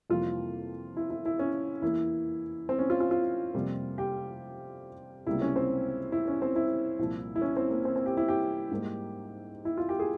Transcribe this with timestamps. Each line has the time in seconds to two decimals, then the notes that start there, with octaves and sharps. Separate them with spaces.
0.10 F2 C3 E3 G3 A#3 F4
0.97 E4
1.10 E4
1.25 E4
1.39 C#4
1.82 E2 E3 A#3 E4
2.69 C4
2.79 C#4
2.90 F4
3.00 F4
3.11 F4
3.54 F2 C3 G3 A#3
3.98 G4
5.27 C#2 C3 G3 A#3 E4
5.41 C#4
5.56 C4
6.12 E4
6.28 C#4
6.42 C4
6.56 E4
6.99 C2 A#2 F3
7.36 E4
7.41 C#4
7.57 C4
7.70 A#3
7.85 C4
7.96 C4
8.06 G4
8.17 E4
8.28 G4
8.71 G#2 G3 A#3
9.65 E4
9.77 F4
9.89 G4
10.00 G#4